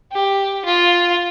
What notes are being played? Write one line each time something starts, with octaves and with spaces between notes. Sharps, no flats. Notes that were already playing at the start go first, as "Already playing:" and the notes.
G4
F4